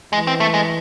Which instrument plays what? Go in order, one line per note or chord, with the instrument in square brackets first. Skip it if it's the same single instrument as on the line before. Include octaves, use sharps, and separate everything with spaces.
[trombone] E3 [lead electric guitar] G#3
[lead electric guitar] C4
A3
G#3